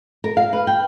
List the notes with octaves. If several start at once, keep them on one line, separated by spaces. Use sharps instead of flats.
A#4
F5
B4
G5